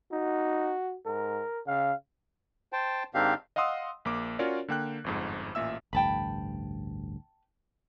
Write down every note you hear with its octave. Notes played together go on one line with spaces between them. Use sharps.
D#4 F#4
G#2 A#4
C#3 F5
C5 G5 A5
G#2 D#3 C4 D4 G4 F5
D#5 F5 F#5 C6 D#6 E6
A#1 A#3 D6
C#4 F4 F#4 A#4 C#5 D5
D3 A#3 G5 F#6
G1 F2 G#2
A1 A#2 E5 E6
A1 D2 G2 G5 A5 B5